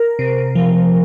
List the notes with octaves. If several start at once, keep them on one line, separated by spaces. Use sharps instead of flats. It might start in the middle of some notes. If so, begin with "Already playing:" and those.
Already playing: A#4
C3
F3